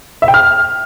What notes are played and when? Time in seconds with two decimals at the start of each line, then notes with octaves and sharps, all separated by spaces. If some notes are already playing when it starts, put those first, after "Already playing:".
0.22 E5
0.28 G5
0.34 F6